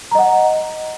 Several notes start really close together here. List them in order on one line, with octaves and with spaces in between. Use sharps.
A#5 D#5 F#5